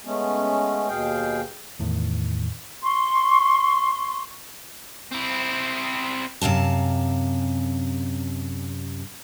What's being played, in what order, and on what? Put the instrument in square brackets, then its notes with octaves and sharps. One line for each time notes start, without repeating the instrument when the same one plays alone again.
[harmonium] G#3 A3 B3 C#4
D#2 B2 G#4 F5 G5
[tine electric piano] E2 A2 D#3
[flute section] C6 C#6
[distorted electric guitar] C4 E4
[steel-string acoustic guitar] F#2 C3 F5 A5